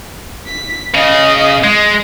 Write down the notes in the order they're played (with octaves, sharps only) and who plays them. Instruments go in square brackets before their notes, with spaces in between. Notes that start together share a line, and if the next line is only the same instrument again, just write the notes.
[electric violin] B6
[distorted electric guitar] C#3 [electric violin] D#5 D#6
[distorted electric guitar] G#3